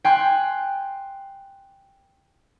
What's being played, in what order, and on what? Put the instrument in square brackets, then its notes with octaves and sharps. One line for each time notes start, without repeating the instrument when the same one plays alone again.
[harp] G5 G#5 C6 F#6